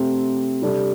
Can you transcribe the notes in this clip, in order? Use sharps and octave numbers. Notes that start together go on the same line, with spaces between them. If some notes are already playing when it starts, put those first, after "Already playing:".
Already playing: C3 A3 C4
C3 G3 D4 A4